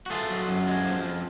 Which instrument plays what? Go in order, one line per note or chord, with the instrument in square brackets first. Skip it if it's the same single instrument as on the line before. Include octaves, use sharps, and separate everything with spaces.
[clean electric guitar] F#4
A3 F4 G#4
F#3
F#2
G#3
F3
F2